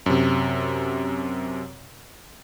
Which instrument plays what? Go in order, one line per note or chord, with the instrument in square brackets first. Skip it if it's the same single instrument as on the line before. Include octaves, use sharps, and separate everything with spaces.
[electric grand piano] F#2 C3